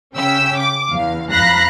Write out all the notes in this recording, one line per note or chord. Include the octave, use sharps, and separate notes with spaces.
C#3 C#4 G5 E6 B6
D6
E2 F5
F2 F5 A#5 B5 F#6 A#6